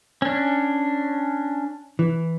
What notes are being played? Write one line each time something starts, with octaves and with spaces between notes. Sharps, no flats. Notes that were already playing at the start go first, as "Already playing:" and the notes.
C#4 D4
E3